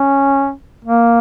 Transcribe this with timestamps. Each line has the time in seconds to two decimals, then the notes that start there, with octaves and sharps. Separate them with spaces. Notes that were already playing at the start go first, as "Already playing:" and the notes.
Already playing: C#4
0.85 A#3